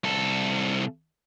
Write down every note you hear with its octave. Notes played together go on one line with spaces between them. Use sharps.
C2 A4